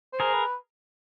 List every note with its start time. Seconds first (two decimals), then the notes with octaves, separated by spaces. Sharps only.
0.13 C5
0.20 G#4 A#4
0.33 B4